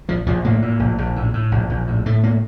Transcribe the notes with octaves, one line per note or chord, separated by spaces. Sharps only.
A#1 F3
A#1 F3
A2 A#3
A2
A#1
A#1
A2
A2
A#1
A#1
A2
A2 A3
A#3